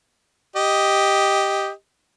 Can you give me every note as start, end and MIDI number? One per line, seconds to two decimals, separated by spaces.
0.56 1.69 67
0.56 1.69 75